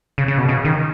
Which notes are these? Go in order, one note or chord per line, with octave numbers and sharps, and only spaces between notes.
C#3
C#3
B2
C#3
D#3